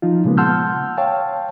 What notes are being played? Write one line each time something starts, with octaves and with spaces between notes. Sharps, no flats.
F3 D#4 F4
A#2 C#3 G#3 A#3 B3
F#5 A5 C6 E6 F6 G6
C#5 F5 G5 A5